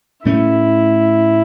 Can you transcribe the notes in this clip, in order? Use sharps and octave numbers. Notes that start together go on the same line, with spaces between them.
A2 A3 C#4 E4